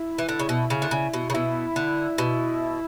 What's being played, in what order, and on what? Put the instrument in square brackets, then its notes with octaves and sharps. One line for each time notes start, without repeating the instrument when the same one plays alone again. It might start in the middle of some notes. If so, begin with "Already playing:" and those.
Already playing: [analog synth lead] E4
[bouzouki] E3
D3
C#3
B2
C#3
D3
C#3
B2
C#3
[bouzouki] B2 [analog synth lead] E4
[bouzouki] D3
B2